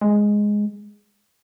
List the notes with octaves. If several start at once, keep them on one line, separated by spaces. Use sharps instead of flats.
G#3